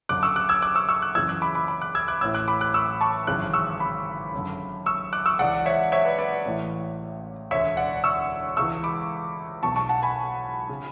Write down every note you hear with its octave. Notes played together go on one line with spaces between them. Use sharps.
F#1 F#2 D3 D6 F#6
C#6 E6
D6 F#6
E6 G#6
D6 F#6
C#6 E6
C#6 E6
D6 F#6
F#1 F#2 C#3 E3 E6 G#6
D6 F#6
B5 D6
B5 D6
B5 D6
D6 F#6
E6 G#6
D6 F#6
A1 A2 E3 E6 G#6
D6 F#6
B5 D6
D6 F#6
C#6 E6
A5 C#6
G#1 F#2 C#3 E3 D6 F#6
C#6 E6
B5 D6
F#1 F#2 D3
C#6 E6
D6 F#6
C#6 E6
C#2 C#3 E3 D5 F#5
C#5 E5
C#5 E5
B4 D5
B4 D5
A1 A2 E3
E1 D2 D3 C#5 E5
D5 F#5
C#6 E6
C#2 C#3 E3 C#6 E6
B5 D6
B1 B2 A5 C#6
A5 C#6
F#5 A5
G#5 B5
C#3